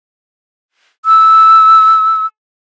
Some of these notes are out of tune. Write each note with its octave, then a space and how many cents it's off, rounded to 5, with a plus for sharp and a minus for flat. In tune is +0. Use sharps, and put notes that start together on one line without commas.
E6 -10